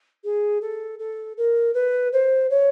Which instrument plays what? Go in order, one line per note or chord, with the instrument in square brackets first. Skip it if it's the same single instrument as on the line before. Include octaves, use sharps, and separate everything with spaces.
[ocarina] G#4
A4
A4
A#4
B4
C5
C#5